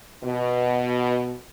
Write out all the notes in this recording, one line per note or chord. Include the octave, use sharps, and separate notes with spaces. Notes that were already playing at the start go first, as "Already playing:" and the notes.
B2